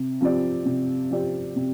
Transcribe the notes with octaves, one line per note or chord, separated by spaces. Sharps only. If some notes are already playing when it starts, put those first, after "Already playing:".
Already playing: C3
F3 C4 G4 D5
C3
F3 C4 G4 D5
C3